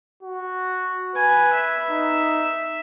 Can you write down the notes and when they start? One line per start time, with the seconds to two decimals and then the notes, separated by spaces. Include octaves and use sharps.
0.23 F#4
1.16 B4 G#5
1.53 E5
1.91 D#4